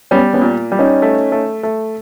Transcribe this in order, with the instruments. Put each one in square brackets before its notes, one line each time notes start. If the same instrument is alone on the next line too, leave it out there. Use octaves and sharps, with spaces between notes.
[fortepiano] G3 [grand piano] B3 C#4
[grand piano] B3 C#4
[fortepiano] A#2
G3
[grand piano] C#4 D#4
[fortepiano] A3
A3
A3